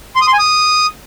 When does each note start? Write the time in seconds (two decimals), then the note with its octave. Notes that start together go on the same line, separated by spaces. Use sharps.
0.16 C6
0.21 D#6
0.27 C6
0.33 G#5
0.39 D#6